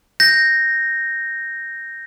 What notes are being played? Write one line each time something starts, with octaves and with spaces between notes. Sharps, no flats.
G6 A#6